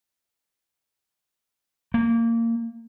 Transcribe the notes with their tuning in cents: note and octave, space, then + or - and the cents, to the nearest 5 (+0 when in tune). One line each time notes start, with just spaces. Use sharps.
A#3 -20